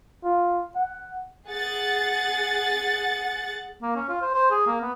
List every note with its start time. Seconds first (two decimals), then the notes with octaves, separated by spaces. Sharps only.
0.24 F4
0.76 F#5
1.49 G#4 F#5 A6
3.82 A#3
3.96 C#4
4.09 F4
4.21 C5
4.34 C5
4.51 G#4
4.67 A#3
4.81 B3